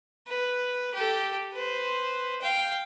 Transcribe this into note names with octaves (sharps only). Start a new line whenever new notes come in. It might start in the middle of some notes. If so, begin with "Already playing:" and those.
B4
G4 A4
B4 C5
F5 G5